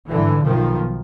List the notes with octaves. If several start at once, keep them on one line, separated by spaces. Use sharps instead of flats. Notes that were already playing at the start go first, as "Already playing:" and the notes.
G#1 G2 D3 E3
B1 B2 D#3 F3